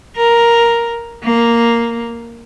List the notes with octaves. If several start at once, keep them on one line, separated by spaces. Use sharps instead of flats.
A#4
A#3